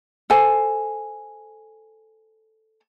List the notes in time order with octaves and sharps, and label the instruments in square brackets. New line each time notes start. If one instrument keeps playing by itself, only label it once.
[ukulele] A4 C5 G#5